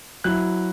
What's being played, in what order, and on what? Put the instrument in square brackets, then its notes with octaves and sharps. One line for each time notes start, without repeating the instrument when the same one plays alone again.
[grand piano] F#3 E4 F#6